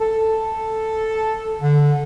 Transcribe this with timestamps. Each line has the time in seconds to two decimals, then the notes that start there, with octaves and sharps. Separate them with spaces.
0.01 A4
1.61 D3